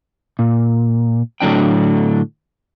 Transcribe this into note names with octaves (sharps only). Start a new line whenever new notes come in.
A#2
A2 D3 F#3 D4 G5